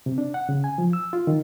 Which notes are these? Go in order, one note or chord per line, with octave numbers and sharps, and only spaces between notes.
C3
D4
F#5
C#3
G#5
F3
E6
F4
D#3